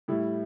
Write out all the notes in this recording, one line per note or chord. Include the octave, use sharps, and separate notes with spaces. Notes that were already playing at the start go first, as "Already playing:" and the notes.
A2 G3 E4